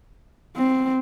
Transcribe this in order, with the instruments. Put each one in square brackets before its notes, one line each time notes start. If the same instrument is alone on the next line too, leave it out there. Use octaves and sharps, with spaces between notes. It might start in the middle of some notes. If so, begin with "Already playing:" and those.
[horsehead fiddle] C4